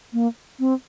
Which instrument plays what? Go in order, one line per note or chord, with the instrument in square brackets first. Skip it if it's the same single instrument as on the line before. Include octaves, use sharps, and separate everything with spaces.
[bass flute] A#3
C4